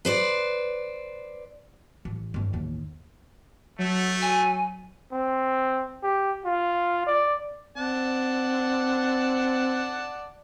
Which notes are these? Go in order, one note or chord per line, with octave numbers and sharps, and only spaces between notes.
B4 C5 D5
A1
G1 F#2
A1 D#2
F#3 A3
G#5
C4
G4
F4
D5
C4 D5 F#5 A5